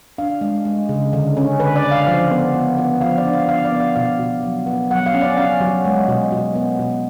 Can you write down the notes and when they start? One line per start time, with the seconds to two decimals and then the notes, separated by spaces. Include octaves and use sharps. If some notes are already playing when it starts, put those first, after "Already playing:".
0.18 D4 F5
0.41 G#3
0.65 G#3
0.89 C#3
1.13 D3
1.37 C#4
1.60 D3 B4
1.76 D5
1.83 D3
1.91 F5
2.07 F3 F5
2.31 B3
2.54 B3
2.78 B3
3.01 F3 F5
3.18 D5
3.25 D4
3.33 F5
3.49 B3 F5
3.65 D5
3.72 B3
3.80 F5
3.96 B2 F5
4.19 B2
4.43 F#3
4.67 B3
4.91 F#3 F#5
5.06 F5
5.14 C#4
5.22 D5
5.37 C#4 F5
5.61 F#3
5.85 G#3
6.09 B2
6.32 B2
6.55 B3
6.79 B2